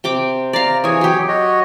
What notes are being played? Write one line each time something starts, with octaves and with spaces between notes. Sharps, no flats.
C3 G5 D6
D5 F5 A#5
E3 G#4 C#5 G#5
F#3 G4
F#4 C#5 D#5